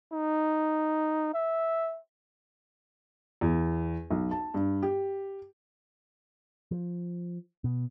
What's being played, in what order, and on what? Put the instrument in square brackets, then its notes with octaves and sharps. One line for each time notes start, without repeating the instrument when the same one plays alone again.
[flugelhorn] D#4
E5
[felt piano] E2
B1
A5
G2
G4
[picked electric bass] F3
B2